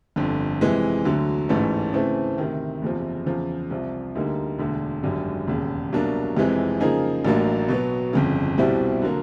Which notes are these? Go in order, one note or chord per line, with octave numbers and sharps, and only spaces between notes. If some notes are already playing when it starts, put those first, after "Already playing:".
G1 F2 D3
F2 C3 E3 G#3
D2 D3 F#3
A1 G#2 E3 A3 C#4
C#3 E3 A3 C4
D2 C3 D#3
F#1 E2 C3 F3
E2 C#3 F3
C2 C3 F3
D2 D3 G3 A#3 D#4
E1 D2 D3
G#1 F#2 D3 G3
E1 D#2 C#3
C2 B2 F#3 A#3 D4
F1 F2 C3 E3 G#3
C#3 F3 A#3 D#4 G#4
A1 A2 F#3 A#3 D4
B2 F#3 B3
G1 F2 C#3
C2 B2 G3 C4 E4
D3 F#3 A#3